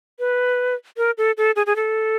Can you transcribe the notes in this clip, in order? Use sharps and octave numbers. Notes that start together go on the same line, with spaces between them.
B4
A#4
A4
A4
G#4
G#4
A4